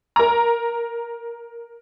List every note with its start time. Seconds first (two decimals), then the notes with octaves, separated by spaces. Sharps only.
0.16 A#4 A#5